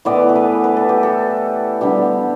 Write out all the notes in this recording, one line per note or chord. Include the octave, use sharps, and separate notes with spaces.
A2 E3 B3 D5
A4
B4
B4
A4
G4
A4
D3 G3 B3 G4